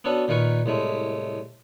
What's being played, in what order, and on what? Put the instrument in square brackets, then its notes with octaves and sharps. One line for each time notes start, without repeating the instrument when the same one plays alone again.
[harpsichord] B3 C#4 D4 F#4 A4
A#2 D#3 A#4 B4 C#6
C2 A2 G#3 A3